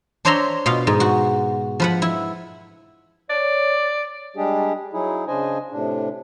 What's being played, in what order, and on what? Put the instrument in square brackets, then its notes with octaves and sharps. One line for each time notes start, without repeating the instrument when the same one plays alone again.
[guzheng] D4 C5 C#5 E5 A#5 C6
B2 F4 F5
G#2
F#4
F3 B4 F#5
E4
[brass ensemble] C#5 [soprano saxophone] D5
[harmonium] G3 G#3 D4 G4 G#4
F#3 D#4 E4 G#4
C#3 D4 C5 D#5 G#5
A2 C3 D4